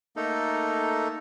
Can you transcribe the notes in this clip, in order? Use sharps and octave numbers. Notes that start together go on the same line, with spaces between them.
A3 A#3 D#4 A4